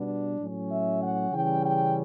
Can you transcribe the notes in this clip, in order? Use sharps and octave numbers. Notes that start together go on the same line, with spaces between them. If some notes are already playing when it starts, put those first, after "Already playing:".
Already playing: B2 G3 B3 D4
A2 F#3 C#4
E5
F#5
C#3 E3 G3 C#4 G5
G5